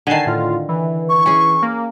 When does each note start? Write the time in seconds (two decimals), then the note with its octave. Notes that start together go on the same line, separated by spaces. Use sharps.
0.07 D3 D#3 G#5 A5 C7
0.26 A2 F4
0.68 E3
1.09 C#6
1.26 C#4 G#4
1.62 A#3